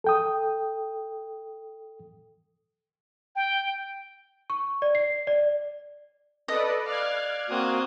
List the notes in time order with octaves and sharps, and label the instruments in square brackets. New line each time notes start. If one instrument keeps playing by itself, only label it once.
[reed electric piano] A4 G5 D#6
[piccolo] G5
[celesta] C#6
D5
C7
D5
[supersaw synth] A4 B4 D5 [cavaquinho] D#5
[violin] D5 F5 [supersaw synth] F6 F#6 G#6
[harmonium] A#3 F#4 [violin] C4 D#6